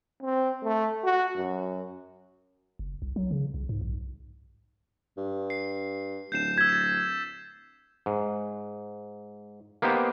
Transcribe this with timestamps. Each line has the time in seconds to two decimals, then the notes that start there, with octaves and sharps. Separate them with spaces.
0.22 C4
0.63 A3
1.03 F#4
1.36 F#2
2.79 F#1
3.02 C2
3.16 F#3
3.31 C#3
3.54 C2
3.69 G#2
3.81 B1
5.17 G2
5.50 C7
6.32 D1 G6 C7 E7
6.58 E6 G#6 B6
6.69 A6 E7
8.06 G#2
9.82 A#3 B3 D#4 G4 C5